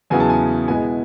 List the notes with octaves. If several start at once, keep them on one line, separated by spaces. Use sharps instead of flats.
E2 C#3 F#3 B3 E4 G#5
A5
G#5
B2 G#3 B3 E4 G#5